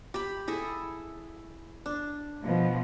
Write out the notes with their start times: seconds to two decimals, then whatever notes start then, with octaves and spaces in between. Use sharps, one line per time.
0.14 G4 B5
0.48 E4 G#4 A4
1.86 D4
2.44 B2 F3